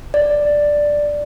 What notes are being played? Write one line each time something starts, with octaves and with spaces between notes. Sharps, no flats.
D5